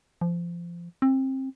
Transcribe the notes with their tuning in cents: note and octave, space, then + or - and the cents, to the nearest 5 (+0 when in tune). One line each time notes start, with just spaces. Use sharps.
F3 -25
C4 +25